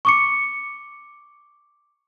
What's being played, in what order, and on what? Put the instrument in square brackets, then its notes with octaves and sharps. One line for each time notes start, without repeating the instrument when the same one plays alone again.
[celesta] C#6 D6 C#7